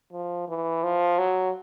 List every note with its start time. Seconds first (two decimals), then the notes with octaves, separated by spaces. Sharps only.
0.12 F3
0.48 E3
0.83 F3
1.18 F#3